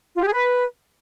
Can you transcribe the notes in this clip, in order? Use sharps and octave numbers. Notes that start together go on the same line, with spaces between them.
F4
G4
G#4
B4